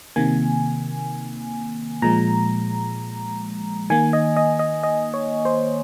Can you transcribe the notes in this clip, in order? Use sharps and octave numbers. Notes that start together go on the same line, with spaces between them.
C3 D#3 A#3 G#5
A#2 F3 G#3 A#5
D#3 A#3 G#5
D#5
D#5
D#5
D#5
C#5
C5